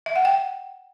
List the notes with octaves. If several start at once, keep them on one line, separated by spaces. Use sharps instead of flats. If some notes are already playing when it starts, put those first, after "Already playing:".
E5
F#5
G5